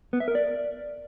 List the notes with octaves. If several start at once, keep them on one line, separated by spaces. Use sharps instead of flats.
B3
E5
A#4
D5